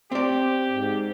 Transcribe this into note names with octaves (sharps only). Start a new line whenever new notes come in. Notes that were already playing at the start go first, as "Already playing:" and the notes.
C4 G4 D5
G#2